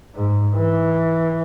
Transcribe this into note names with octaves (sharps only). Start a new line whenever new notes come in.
G#2
E3